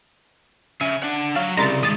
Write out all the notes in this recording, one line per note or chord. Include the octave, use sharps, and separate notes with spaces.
C#3 E5 G#5
D4 F#5
F#3 C#5 F5
C2 C#3 A#5 C6 A6
D#3 G#3 D#6 A6